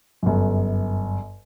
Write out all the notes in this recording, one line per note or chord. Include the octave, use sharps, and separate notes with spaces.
G1 F#2